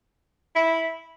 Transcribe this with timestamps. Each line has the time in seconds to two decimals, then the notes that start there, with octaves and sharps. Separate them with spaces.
0.56 E4